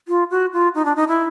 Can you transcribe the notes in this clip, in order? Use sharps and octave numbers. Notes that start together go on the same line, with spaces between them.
F4
F#4
F4
D#4
D4
D#4
E4